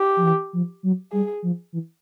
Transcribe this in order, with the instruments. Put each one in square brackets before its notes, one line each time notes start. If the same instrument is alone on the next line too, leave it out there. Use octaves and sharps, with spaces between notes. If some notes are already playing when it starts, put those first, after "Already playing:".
Already playing: [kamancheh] G4
[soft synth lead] F3
E3
F3
F#3
[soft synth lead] G3 [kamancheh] G#4
[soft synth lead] F3
E3